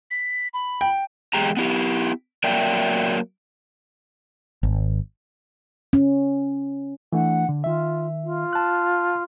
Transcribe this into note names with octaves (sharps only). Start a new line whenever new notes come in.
B6
B5
G5
E2 G#3 G4 A#5
B3 E4 G4
F#3 A#3 A#4 D5 E5 G5
G#1
C#4
E3 A3 D4 F#5
D3
D#3 F4 E5
F4
A5 F#6